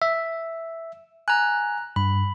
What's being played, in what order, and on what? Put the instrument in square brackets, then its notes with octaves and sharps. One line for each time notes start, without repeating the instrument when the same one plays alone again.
[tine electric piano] E5
[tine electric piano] G#5 [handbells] A#5 F#6
[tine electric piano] G2 [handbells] B5